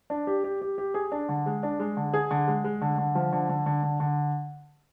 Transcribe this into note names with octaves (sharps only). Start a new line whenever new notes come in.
D4
G4
G4
G4
G4
G#4
D4
D3
G#3
D4
G#3
D3
G#4
D3
G#3
G#3
D3
D3
F3
D3
D3
D3
D3
D3